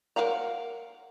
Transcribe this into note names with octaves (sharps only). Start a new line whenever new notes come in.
A#4 B4 F5 F#5 A#5